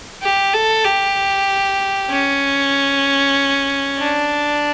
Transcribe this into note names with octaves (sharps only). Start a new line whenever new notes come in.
G4
A4
G4
C#4
D4